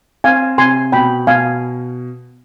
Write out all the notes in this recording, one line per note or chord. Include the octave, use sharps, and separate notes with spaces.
C4 F5 G#5
C3 G#5 C6
B2 G5 B5
B2 F5 G#5